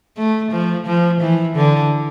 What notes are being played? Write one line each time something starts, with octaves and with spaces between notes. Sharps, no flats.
A3
F3
F3
E3
D3